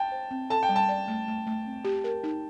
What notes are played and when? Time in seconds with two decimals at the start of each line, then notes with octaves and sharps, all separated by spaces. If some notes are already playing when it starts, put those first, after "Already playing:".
Already playing: G5 A5
0.12 C5
0.31 C4
0.50 A4 A5
0.63 G5
0.69 G3
0.76 A5
0.89 D5
1.08 A3
1.28 A3
1.47 A3
1.66 C4
1.85 G4
2.04 A#4
2.23 D#4